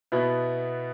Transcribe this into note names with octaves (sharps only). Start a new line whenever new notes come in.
B2 B3 E4 B4